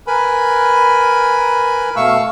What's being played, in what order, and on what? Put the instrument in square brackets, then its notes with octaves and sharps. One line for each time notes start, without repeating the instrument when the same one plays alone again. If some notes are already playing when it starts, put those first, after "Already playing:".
[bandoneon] A#4 B4 G#5 B5
B2 A3 F5 C#6 E6